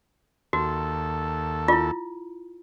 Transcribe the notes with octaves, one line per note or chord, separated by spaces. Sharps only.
D#2 F#4 A4
E4 F4